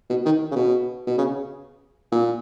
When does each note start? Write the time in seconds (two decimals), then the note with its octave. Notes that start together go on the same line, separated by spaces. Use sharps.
0.10 B2
0.25 D#3
0.51 C#3
0.55 B2
1.07 B2
1.18 C#3
2.12 A#2